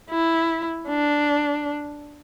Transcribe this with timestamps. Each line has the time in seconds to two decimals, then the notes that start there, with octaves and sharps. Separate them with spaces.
0.10 E4
0.88 D4